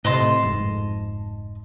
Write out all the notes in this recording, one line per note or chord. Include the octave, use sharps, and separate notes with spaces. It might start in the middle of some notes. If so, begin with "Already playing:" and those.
A2 C3 D#5 A5 C6
F1 G#2